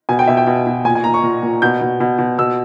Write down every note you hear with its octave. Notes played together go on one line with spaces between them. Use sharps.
B2 G#5
G5
B2 E5
G5
B2
B2
A#2 G#5
G#5
A#2 A#5
C#6
A#2
A#2
B2 G6
B2
B2
B2
B2 E6